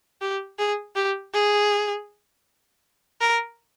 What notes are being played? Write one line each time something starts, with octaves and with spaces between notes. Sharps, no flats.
G4
G#4
G4
G#4
A#4